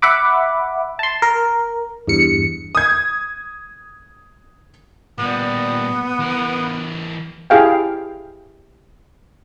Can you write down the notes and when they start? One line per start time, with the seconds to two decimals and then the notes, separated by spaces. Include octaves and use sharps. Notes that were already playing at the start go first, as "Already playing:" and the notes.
0.02 E5 F#5 B5 D6
0.99 A5 C6
1.22 A#4
2.08 E2 G2 C#7
2.75 D#6 G#6
5.18 A#2 G3 B3
6.19 E3 A#4
7.50 E4 G4 G#4 F5 G5